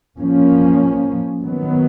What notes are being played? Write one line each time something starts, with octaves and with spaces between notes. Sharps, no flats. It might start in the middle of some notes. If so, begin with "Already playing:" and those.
F3 A#3 C#4
D#3 F#3 B3